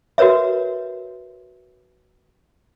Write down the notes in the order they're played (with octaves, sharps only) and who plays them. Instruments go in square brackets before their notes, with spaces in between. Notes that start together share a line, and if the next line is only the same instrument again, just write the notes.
[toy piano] F#4 A#4 B4 C#5 E5